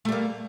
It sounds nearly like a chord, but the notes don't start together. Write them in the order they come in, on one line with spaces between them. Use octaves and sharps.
A3 G3 A#3